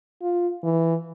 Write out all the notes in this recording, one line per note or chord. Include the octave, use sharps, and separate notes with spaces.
F4
E3